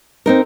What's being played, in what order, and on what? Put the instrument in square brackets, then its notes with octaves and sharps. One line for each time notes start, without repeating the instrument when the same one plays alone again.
[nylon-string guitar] C4 D#4 A#4